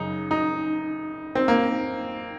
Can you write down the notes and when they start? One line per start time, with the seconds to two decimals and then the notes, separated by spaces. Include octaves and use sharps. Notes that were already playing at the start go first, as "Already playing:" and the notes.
Already playing: F#2 C#3 D#4
0.31 D#4
1.35 C4
1.48 A#3